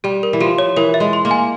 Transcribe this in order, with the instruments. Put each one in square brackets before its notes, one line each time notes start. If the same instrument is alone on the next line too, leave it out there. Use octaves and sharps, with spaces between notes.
[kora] G3 [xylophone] G4
[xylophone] A#4
[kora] E3
[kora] F3 [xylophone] G4
[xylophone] C#5
[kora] E3 [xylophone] A#4
[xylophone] E5
[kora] G#3
[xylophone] C6
[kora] A#3
[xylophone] G#5